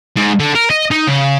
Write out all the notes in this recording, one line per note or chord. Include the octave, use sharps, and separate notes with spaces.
G#2
D3
A#4
D#5
D#4
C#3